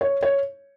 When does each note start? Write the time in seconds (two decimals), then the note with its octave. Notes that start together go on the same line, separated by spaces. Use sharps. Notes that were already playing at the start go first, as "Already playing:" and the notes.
0.01 C#5
0.23 C#5